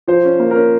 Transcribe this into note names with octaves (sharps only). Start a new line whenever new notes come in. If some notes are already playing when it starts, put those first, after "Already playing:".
F3 C5
C#4
A#3
C#4 A#4